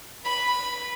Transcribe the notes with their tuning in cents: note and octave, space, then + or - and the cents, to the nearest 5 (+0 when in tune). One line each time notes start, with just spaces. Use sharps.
B4 -20 B5 +0